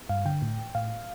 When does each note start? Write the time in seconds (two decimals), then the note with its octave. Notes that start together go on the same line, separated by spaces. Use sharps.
0.09 G2 F5
0.25 D3 G5
0.42 A2
0.75 A2 F5